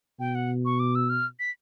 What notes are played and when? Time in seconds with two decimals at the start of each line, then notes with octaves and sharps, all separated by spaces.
0.20 B2 G5
0.35 F#5
0.65 C#6
0.80 D6
0.95 E6
1.10 F6
1.39 B6